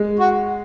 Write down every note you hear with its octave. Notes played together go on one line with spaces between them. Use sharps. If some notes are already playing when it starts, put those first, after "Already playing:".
Already playing: G#3
F#4